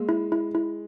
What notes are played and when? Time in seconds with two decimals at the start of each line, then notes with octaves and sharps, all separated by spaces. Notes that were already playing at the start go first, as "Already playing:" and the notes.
Already playing: G#3 A#3
0.09 E4
0.32 E4
0.55 E4